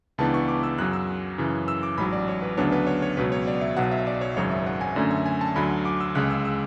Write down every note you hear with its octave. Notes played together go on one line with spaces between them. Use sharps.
C#2 C#3 E3 B3 D4 A5
C#6
D6
E6
F#2 C#3 F#3 F#6
E6
F#2 C#3 E3
E6
D6
A1 G#2 F#3 B5
D5
C#5
B4
D2 C#3 F#3 B3 D4 C#5
B4
C#5
C#5
C#2 B2 F#3 B4
C#5
D5
E5
B1 B2 F#3 F#5
E5
D5
C#5
G#1 F#2 C#3 F#3 C#5
E5
F#5
G#5
F#2 D3 A3 C#4 D5
E5
G#5
A5
D2 D3 F#3 B5
D6
E6
C#2 C#3 G#3 F#6
E6
E6